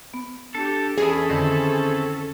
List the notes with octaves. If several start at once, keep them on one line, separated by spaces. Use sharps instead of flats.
B3
D4 G4 A4
E2 C#4 E4 G#4 A4
F2 D3 D#3 C4 E4